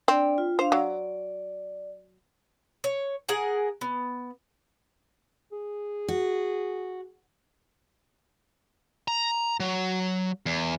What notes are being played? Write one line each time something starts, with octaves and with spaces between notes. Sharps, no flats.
C4 D4 D5
F4
D4 C5 F5
F#3 D5
C#5
G#4 A#4 F#5
B3
G#4
F#4
A#5
F#3
E2